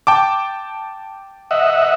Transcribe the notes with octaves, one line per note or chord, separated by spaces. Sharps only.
G5 A5 D6
D#5 E5 F#5